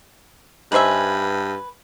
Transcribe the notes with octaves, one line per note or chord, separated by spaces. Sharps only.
G2 D#4 B4 C5 E5 G#5